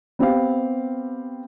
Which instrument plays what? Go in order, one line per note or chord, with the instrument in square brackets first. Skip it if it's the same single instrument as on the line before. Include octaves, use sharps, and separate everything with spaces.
[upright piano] B3 C4 G4 F5